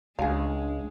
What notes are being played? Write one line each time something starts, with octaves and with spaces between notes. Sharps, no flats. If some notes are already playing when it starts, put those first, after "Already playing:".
C#2 G#3 D4 G#4 F5